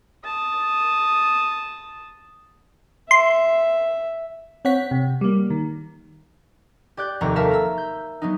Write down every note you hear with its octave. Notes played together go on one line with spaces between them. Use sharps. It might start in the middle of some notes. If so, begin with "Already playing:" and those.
A5 D#6
E5 C6
C4 C#5 F#5 B6
C3
G3 A#3
D#3
G4 D5 F#6 G6
F1 D#2 A#4 F#5 A#5 C#6
A4 A#4 E5 F5 A5 A#5
A#5 E6
G6
F#3 B3 D#4